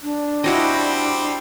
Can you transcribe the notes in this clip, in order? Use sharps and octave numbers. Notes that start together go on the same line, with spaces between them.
D4
G3 C4 E4 F#4 D#5